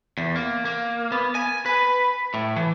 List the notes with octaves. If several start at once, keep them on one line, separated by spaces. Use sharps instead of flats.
E2
A#3
A#3
B3
G#5
B4
A2
E3